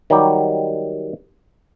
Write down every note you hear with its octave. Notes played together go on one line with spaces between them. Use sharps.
D#3 F#3 G3 G4